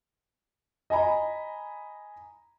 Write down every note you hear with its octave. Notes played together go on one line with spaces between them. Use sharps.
D#5 G#5 A#5 B5